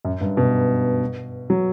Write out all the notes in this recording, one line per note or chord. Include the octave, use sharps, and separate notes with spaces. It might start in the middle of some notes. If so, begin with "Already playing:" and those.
F#2
G2
B2
F#3